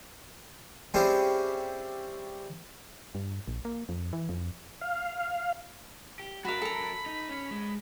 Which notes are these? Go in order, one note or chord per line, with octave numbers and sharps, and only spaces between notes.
G3 C4 C#4 E4 G4 G#4
G2
A#1
A#3
F2
E3
F2
F5
G4
F#3 F#4 A#4 F5 B5
A4 A#5
D#4
C#4
G#2 G#3